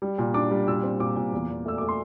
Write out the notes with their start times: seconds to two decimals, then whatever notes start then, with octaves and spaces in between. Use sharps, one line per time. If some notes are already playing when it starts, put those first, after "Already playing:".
0.02 G3
0.19 A#2
0.34 D4 D6
0.51 G3
0.67 A#2 E6
0.84 C4
1.00 A#2 D6
1.16 A#2
1.32 E2
1.49 E2
1.66 A3 E6
1.78 A3 D6
1.89 C6